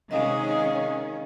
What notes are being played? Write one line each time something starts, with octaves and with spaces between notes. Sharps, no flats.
C3 D#3 G#3 C#4 G#4 D#5 F5